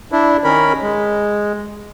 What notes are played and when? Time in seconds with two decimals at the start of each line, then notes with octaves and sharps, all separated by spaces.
0.12 D4 E4
0.44 D#3 C#4 A#4 B5
0.82 G#3